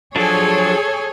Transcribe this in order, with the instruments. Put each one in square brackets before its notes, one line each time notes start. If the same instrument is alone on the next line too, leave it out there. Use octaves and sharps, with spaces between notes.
[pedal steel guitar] F3 F#3 D4 [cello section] G#4 C#5 [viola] A4 G#5